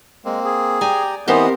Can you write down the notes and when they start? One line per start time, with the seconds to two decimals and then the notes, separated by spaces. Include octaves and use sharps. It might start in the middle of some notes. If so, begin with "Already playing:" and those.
0.25 G#3 A#3 C4
0.44 G#4
0.81 G4 D5 G5 G#5 A#5
1.28 E3 B3 C4 G4 A#4 C5 D#5 F#5